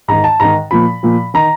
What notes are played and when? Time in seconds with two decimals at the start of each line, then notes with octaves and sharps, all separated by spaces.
0.08 G#2 D#3 A#5
0.24 A5
0.40 G#2 D#3 A#5
0.71 A#2 F3 B5
1.03 A#2 F3
1.34 D#3 A#5